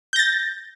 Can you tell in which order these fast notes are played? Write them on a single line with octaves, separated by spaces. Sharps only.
G6 A#6 A6